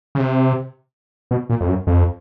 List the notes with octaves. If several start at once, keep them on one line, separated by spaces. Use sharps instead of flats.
C#3
C3
B2
A#2
F2
F#2
F2